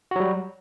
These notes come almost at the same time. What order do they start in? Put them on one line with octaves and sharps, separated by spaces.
F#4 F#3 G3